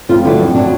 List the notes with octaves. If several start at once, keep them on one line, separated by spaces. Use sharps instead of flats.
F2 F4
D3 F#3 E4
F2
D3 F#3 D4